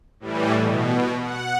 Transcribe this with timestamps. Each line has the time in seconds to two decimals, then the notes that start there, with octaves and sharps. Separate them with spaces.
0.20 A2 E3 G3
0.54 B2
1.20 F#5